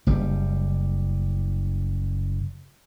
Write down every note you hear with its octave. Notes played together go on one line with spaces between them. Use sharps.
F#1 G3